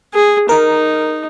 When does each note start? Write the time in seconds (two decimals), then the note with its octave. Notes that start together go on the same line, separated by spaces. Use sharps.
0.14 G#4
0.49 D#4 A#4